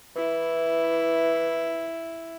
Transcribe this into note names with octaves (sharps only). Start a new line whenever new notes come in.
E3 E4